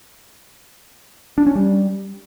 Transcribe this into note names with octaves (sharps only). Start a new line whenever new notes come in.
D4
C#4
G3